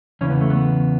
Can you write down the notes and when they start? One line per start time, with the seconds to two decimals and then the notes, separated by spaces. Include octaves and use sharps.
0.21 E2 C#3 E3 C#4
0.30 B3
0.41 A3
0.50 B3